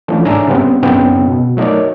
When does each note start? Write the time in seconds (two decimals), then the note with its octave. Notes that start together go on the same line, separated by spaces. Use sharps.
0.08 E3 F3 A3 C#4 D4
0.25 G#2 D4 C#5 E5 G#5 A#5
0.47 C#3 G3 B3 C4
0.82 F#2 C#3 B3 C4 D#4 G5
1.27 B2
1.57 F#3 A3 D#4 A#4 C#5 D5